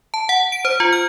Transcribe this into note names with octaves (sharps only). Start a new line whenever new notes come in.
A5
F#5
D7
C5
F4
F6